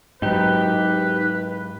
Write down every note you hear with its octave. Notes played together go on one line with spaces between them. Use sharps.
G#2 F#3 D#4 G4 B4